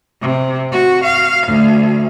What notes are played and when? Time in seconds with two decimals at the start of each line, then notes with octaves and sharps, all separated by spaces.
0.22 C3
0.72 F#4
1.04 F5
1.47 D2